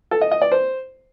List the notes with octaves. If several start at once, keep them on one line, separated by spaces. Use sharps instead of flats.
A4
D#5
D#5
D5
C5